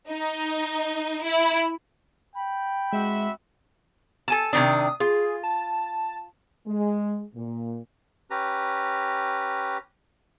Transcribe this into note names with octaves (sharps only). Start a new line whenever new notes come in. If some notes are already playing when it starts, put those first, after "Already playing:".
D#4
E4
G5 B5
G#3 C4 F#4 E5
A4 G#5 A5
C3 D#3 D4 D#6
F4 G#4
A5
G#3
A#2
C#4 G4 B4 A#5